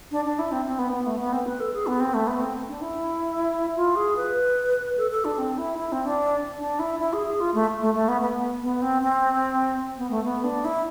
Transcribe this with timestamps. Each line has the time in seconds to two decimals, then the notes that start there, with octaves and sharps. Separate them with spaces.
0.11 D4
0.25 D4
0.39 E4
0.52 C4
0.65 C4
0.79 B3
0.92 B3
1.06 A3
1.19 B3
1.32 C4
1.46 B4
1.60 A4
1.74 G#4
1.87 B3
2.00 C4
2.14 A3
2.27 B3
2.41 C4
2.68 D4
2.81 E4
3.76 F4
3.96 G#4
4.16 B4
4.97 A4
5.11 A4
5.25 D4
5.38 C4
5.58 E4
5.78 E4
5.92 C4
6.05 D4
6.59 D4
6.79 E4
7.00 E4
7.13 G#4
7.26 G#4
7.40 F4
7.54 A3
7.81 A3
7.94 A3
8.08 B3
8.21 B3
8.62 B3
8.82 C4
9.02 C4
9.97 B3
10.10 A3
10.24 B3
10.44 D4
10.64 E4